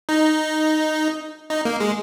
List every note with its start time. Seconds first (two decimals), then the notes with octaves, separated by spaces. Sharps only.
0.09 D#4
1.50 D#4
1.65 A#3
1.80 G#3